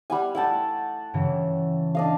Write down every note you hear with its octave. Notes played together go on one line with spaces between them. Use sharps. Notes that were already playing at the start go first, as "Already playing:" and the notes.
G3 F#5 G#5
A3 E4 F#5 G5 A5
G2 C#3 E3
D4 D#5 F5